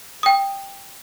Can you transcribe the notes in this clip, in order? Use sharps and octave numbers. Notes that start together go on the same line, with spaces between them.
G5 D#6